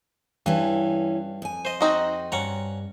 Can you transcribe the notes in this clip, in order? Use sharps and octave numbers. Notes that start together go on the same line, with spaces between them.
G2 E3 C#4
F2 G#5
C5 D#5
C4 D#4 F#4
G2 C#4 F#5 A#5